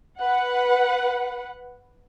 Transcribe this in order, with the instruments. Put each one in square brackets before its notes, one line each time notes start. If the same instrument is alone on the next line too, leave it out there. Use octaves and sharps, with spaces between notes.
[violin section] B4 F#5